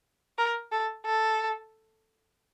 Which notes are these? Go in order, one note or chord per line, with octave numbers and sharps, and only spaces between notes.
A#4
A4
A4